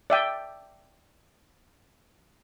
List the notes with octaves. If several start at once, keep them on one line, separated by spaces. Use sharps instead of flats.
D5 E5 G5